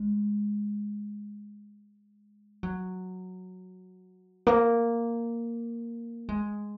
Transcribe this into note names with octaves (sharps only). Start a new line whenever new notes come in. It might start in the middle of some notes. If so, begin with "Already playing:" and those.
Already playing: G#3
F#3
A#3
G#3